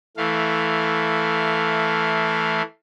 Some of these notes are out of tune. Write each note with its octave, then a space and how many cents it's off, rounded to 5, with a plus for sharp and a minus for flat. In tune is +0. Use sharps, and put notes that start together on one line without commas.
E3 -5 A3 +0 F5 +0